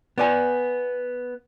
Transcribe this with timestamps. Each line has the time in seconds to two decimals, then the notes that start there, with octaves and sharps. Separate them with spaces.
0.18 B3 D5 G#5